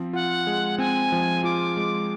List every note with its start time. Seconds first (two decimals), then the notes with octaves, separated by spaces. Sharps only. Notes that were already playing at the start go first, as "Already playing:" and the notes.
Already playing: F3 C4
0.13 F4 F#5
0.47 G#3
0.78 C4 G#5
1.12 F3
1.44 F4 D6
1.77 G#3